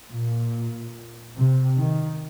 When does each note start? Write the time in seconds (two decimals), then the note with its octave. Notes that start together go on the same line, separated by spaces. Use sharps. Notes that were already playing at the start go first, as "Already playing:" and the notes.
0.11 A#2
1.37 C3
1.78 D#3